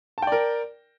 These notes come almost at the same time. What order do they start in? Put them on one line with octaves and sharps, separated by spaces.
A5 G5 D5 A#4